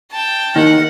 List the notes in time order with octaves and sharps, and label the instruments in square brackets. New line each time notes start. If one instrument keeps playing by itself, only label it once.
[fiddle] G5 A5
[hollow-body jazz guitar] D#2 D#3 [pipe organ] A#4 D#5 [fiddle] F#5